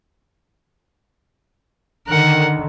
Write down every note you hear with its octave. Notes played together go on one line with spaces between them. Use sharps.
D3 D#3 A#4 F#5